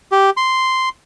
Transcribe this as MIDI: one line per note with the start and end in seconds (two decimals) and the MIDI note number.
0.12 0.30 67
0.37 0.89 84